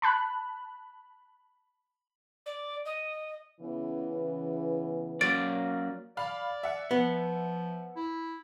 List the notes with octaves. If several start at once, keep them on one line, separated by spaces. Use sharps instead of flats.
A5 B5 F#6
D5
D#5
C#3 E3 B3
F#3 A#3 C#4 D5 A6 D7
D5 F5 B5 F6
E5 F#5
F3 B3
E4